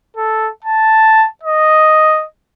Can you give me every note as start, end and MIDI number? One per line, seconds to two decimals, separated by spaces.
0.17 0.49 69
0.65 1.26 81
1.43 2.25 75